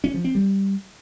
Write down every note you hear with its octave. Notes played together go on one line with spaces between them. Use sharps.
C#4
F3
C4
G3